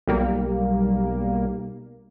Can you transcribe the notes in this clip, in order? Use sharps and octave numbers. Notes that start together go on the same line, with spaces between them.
B1 G3 A#3